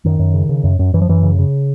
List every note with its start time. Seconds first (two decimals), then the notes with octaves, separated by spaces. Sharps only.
0.05 F#2 D#3
0.19 F#2
0.34 C#3
0.49 C#3
0.64 F#2
0.79 F#2
0.94 F#2 E3
1.02 F3
1.09 F#2 E3
1.23 C#3
1.39 C#3